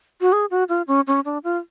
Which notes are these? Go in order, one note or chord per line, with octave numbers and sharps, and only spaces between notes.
F#4
G#4
F#4
F4
C#4
C#4
D4
F4